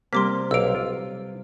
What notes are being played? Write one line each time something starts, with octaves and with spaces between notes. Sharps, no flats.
C3 G3 A#3 C6 D6 B6
B1 F5 E6 D7
F4